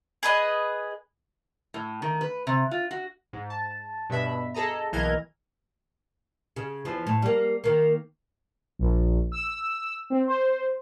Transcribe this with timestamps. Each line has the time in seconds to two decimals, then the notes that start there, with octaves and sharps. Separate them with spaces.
0.23 G#4 B4 D#5
1.74 A2
2.02 D#3
2.21 B4
2.47 C3
2.71 F4
2.91 F#4
3.33 G#2
3.50 A5
4.09 G2 B2 E5 B5
4.55 G#4 A4 D#5 A#5
4.92 B1 E3 A#3 D#5 F6 G#6
6.56 C#3
6.85 E2 E3 F3
7.07 A2
7.22 G3 A#3
7.64 D#3 A#3
8.79 A#1
9.32 E6
10.10 C4
10.28 C5